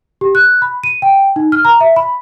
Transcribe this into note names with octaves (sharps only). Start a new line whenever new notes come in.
G4
F#6
B5
D#7
G5
D#4
F6
A#5
E5
B5